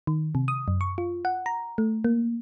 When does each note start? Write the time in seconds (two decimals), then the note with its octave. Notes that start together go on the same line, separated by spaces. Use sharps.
0.07 D#3
0.35 C3
0.48 D#6
0.68 F#2
0.81 C#6
0.98 F4
1.25 F#5
1.46 A#5
1.78 A3
2.04 A#3